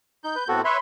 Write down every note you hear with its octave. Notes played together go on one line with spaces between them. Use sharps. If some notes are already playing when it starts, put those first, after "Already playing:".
D#4 G6
B4
A2 B3 C4 F#4 A4
B4 C#5 E5 B5 C6